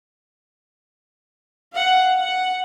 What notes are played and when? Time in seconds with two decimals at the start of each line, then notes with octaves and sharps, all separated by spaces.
1.73 F5 F#5
2.18 F#5